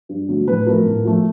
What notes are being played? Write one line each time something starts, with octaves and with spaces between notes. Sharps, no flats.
G2
D3 F#3 A3
A2 B4
F3 A3 A#4
A2
F3 A3